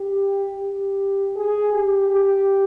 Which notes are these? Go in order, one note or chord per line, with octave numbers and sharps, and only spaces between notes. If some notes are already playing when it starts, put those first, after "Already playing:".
Already playing: G4
G4
G#4
G4
G4